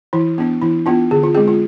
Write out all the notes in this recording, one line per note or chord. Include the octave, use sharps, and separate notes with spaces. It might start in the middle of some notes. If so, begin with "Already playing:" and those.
E3 E4
B3 D4
E3 E4
B3 D4 F4
D3 G#4
F4
G#3 C4 G#4
F4